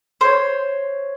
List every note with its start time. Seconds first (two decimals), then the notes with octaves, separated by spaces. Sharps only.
0.21 C5 C#5